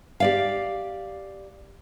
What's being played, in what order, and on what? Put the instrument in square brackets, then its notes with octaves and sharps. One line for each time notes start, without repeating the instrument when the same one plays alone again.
[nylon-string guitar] G4 D5 F5